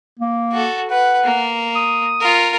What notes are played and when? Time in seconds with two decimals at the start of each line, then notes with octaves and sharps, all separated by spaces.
0.19 A#3
0.52 F#4 A4
0.90 B4 F#5
1.24 A#3
1.76 D#6
2.20 F4 A#4